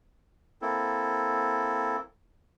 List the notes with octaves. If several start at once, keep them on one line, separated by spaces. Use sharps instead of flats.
A#3 C4 E4 A4